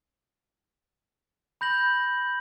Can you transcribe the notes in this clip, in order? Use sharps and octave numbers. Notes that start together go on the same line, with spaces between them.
B5 G6 A#6 F#7